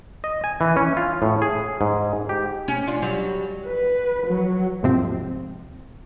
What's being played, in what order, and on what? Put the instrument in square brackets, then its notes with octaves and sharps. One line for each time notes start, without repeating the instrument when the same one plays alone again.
[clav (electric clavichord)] D#5
G#5
E3
C#4
F4
A2
G#4
G#2
G4
[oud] C#4
D4 F4
F#3 G3
[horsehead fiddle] B4
F#3
[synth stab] D#2 G#2 C3 F3 C4